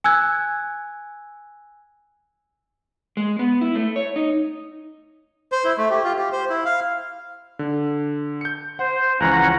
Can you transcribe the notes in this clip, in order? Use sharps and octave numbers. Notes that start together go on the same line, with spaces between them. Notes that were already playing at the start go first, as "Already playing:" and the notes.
G#5 E6 F#6 G#6
G#3
B3
E4
A3
C#5
D#4
C5
E4
A3
G4
F4
G4
C5
E4
F5
D3
G6 C#7
C5 F#5
C#2 E3 F3 C#4 F#5 A#5